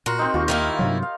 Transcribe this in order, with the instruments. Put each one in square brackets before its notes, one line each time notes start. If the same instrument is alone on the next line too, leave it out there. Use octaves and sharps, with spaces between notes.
[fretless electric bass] A#2 [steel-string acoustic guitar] F#4 [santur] A#4 C6
[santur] C4 D#4
[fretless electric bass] D#2 [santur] F4 G4 C#6
[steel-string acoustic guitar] D#3 A#3 E4
[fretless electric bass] G2 C3 F#3
[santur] F5